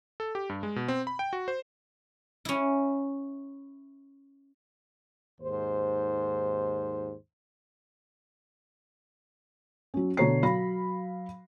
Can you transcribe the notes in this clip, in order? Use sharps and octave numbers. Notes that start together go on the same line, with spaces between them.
A4
G4
G2
G#3
B2
C4
B5
G5
F#4
C5
C#4 E4
D#2 G#2 C5
F#3 C#4
B2 D3 F#4 C#5 A#5 C7
F#3 F5 B5 A#6